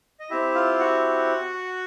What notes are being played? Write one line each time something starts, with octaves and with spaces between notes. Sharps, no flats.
D#5
C4 E4 G4 E5
F4 F5
F#4 F#5